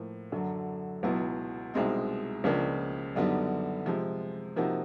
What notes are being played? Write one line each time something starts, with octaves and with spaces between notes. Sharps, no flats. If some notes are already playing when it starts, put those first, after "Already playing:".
Already playing: A2 F3 A#3
F#2 D3 F#3
C#2 B2 F#3 B3 E4
C2 B2 G#3 C4 D#4
C#2 C#3 F3 A#3 D4
F#2 D3 G3 B3 D#4
C3 F3 G#3
C3 F3 A#3 D#4 F#4